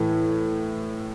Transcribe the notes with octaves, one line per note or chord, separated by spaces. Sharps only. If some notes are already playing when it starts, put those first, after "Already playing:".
Already playing: A2 E3 A3